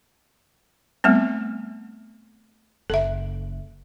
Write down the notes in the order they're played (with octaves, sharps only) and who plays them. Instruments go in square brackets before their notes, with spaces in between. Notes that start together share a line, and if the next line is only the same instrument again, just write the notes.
[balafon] G3 A3 B3 C4
[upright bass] F#1 [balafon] A4 E5